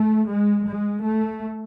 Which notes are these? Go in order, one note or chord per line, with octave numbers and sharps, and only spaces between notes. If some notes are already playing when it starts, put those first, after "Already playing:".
Already playing: A3
G#3
G#3
A3